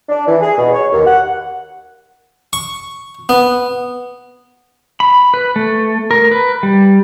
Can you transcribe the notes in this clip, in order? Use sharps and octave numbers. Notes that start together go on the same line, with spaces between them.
D4
E3
G#4
B2
C#5
D#2
F#5
C#6
B3
B5
B4
A3
A#4
B4
G3